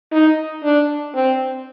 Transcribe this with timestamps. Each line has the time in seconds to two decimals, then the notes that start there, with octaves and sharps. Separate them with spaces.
0.12 D#4
0.63 D4
1.14 C4